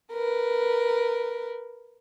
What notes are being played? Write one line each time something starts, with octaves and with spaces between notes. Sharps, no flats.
A#4 B4